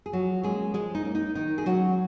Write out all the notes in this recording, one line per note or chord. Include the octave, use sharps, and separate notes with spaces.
G#4
F3 F#3 F#4
G#3 A#3 C#4 G#4
F3 G#3 G#4
D#4
A#3 C#4
D#4
D#3 D#4
G#4
F#3 G#3 C#4 F#4